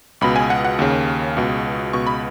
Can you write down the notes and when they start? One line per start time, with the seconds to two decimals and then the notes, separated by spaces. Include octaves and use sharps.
0.21 C#2 B2 B5
0.36 G#5
0.50 F#5
0.65 F#5
0.79 D#2 C#3
1.37 C#2 B2
1.93 C#2 B2 C#6
2.07 B5